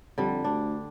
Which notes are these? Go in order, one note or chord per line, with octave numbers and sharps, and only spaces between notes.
F2 D3 G3
D2 D4